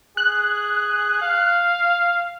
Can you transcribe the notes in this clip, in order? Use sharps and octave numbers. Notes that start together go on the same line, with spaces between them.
G#4 F#6
F5